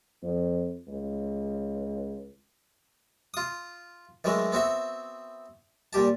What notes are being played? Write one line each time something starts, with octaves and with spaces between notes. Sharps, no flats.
F2
C#2
F4 D#6
D#3 E3 F#3 G#3 A3
B3 C4 F#4 E5
A#2 G3 G4 A5